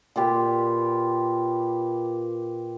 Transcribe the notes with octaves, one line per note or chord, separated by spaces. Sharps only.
A#2 F4 G4 B4